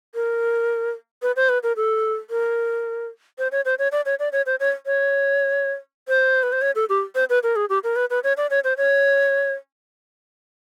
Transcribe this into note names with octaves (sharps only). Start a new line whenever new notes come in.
A#4
B4
C5
B4
A#4
A4
A#4
C5
C#5
C5
C#5
D5
C#5
D5
C#5
C5
C#5
C#5
C5
B4
C5
C#5
A4
G4
C5
B4
A#4
G#4
G4
A#4
B4
B4
C#5
D5
C#5
C5
C#5